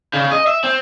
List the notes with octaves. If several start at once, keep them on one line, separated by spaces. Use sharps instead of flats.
C#3
D#5
E5
C4